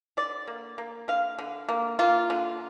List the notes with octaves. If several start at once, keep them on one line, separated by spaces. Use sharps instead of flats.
D3 D5
A#3
A#3
D3 F5
D3
A#3
A#3 F4
D3